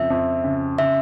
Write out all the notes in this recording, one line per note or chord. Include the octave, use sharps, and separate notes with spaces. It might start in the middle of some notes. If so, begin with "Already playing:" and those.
Already playing: F2 C#3 E5
F2
C#3
C#3 E5